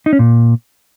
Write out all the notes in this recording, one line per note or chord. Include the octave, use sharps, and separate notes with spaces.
D#4
C#4
A#2